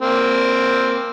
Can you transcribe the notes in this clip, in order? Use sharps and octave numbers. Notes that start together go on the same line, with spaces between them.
A#3 C4